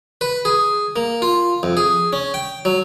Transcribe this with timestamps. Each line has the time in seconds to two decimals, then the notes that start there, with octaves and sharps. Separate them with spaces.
0.21 B4
0.45 G#4
0.96 A#3
1.22 F4
1.63 F2
1.77 G#4
2.13 C#4
2.34 G5
2.65 F#3